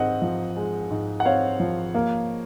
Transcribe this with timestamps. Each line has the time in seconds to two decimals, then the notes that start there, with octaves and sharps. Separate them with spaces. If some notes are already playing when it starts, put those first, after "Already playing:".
Already playing: G#2 G#3 C4 D#5 F#5
0.22 F3
0.57 G#3
0.91 G#2
1.20 F#5
1.25 C4 C#5 F5
1.60 F3
1.95 A#3